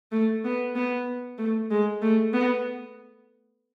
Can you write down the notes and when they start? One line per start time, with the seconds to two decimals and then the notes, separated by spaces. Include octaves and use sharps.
0.12 A3
0.44 B3
0.75 B3
1.38 A3
1.70 G#3
2.02 A3
2.33 B3